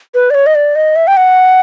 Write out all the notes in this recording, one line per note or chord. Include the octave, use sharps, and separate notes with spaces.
B4
D5
C#5
D#5
D5
D#5
E5
G5
F#5